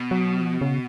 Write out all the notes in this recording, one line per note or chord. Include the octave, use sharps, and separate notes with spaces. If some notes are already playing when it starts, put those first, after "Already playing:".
Already playing: B2
F#3
F3
C#3